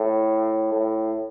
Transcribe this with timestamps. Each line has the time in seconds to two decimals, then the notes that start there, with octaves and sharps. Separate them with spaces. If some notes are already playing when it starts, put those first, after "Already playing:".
Already playing: A2
0.72 A2